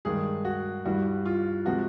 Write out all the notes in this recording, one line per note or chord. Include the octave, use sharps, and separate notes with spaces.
G2 D#3 G#3 G#4
F#4
G2 E3 G3 F#4
F4
C3 F3 G#3 F#4